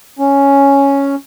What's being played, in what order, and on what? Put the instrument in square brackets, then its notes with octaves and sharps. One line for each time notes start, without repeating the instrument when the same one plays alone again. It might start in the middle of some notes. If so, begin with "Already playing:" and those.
[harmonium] C#4